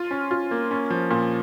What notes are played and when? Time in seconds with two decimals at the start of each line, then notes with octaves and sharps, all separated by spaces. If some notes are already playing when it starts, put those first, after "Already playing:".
Already playing: F4
0.11 C#4
0.31 F4
0.51 A#3
0.71 C#4
0.90 F3
1.11 A#2